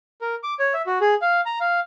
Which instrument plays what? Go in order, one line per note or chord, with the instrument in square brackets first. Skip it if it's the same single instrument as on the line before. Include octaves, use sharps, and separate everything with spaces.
[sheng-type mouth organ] A#4
D6
C#5
E5
F#4
G#4
F5
A#5
F5